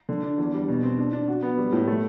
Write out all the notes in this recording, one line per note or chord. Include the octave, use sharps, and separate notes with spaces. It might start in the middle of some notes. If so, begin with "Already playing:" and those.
D3
D4
E2
G3
B2
C4
D4
D4
F#4
B3
G3
A2
A3